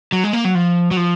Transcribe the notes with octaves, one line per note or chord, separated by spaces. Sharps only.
F#3
G#3
A#3
F#3
F3
F#3
F3